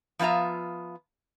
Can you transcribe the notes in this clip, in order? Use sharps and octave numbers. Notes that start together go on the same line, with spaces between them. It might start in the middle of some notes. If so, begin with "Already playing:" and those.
F3 B3 F4 E5 A#5